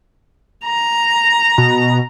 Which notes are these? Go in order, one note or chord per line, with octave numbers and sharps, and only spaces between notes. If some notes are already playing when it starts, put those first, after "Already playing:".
A#5
B2